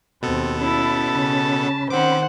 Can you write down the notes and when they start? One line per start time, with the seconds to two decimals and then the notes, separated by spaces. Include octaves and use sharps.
0.23 D#2 B2 B3 C4 A4
0.61 C#4 E4 A5 B5
1.13 C#3
1.90 D#3 C4 C5 F#5 D6